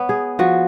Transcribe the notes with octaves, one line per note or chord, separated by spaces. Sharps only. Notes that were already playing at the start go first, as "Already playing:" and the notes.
Already playing: B3 C#5
G#4
F3 F#4